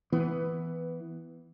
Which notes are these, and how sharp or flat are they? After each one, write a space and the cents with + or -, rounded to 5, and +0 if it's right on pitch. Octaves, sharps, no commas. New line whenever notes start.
E3 +0 B3 +10